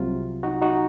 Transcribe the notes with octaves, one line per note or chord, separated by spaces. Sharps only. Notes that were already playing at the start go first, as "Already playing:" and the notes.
Already playing: C2 C3 F#3 F4
D#4 F#4
D#4 F#4